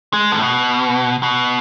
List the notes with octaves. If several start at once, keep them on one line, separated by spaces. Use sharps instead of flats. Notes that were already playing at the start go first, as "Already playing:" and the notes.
G#3
A2
B2
B2